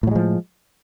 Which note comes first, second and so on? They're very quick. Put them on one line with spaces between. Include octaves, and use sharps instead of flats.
A2 F#3 G#3 F3